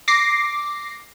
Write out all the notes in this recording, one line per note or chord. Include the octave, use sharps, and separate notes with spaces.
D6 A#6 C7